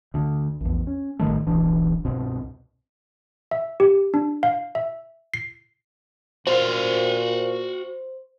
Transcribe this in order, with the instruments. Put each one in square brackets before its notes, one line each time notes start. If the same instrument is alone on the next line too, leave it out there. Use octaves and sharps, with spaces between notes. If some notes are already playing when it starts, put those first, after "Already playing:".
[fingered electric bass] D2 D3
A#1 E2
C#4
A1 G2 D#3 A3
D1 B1 E3 D4
C2 G2 B2 C4
[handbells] E5
G4
D4
F5
E5
C7
[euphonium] A#2 [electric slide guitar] F#4 F5 [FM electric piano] C5